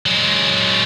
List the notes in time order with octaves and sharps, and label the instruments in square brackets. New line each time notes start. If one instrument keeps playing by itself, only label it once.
[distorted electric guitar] F#3 G#3